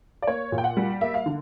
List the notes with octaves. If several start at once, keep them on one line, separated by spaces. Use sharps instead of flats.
D5
A#3 C#5
A#2
G5
F#5
G3
A#3 E5
F5
D3